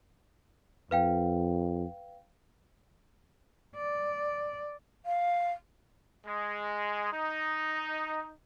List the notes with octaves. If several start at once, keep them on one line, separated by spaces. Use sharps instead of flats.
F2 B4 F5 G5
D5
F5
G#3
D#4